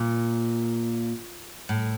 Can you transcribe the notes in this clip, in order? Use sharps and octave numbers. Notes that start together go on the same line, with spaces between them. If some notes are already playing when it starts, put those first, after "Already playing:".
Already playing: A#2
A2